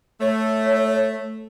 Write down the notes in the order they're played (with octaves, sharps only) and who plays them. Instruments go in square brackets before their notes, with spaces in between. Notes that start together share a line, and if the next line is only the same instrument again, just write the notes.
[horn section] A3 [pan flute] C#5